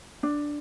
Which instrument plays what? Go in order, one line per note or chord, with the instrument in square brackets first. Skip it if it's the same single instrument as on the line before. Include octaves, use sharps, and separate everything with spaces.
[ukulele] D4